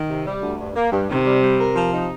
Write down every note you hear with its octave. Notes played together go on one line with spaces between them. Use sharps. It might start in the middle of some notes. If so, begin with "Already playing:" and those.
Already playing: D#3
C3
G3
D2
G2
A#3
G2
C3 D#3
G3
G3
A#4
F3
D#4